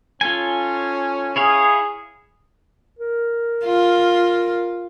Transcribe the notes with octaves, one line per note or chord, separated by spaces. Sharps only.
C#4 F4 A4 G#5
E4 G#4 C#5 F5
A#4
F4